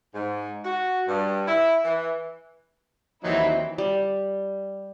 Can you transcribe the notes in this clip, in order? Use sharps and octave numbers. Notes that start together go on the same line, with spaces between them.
G#2
F#4
G2
E4
E3
D#2 E3 F#3 C4 D#4 E4
G3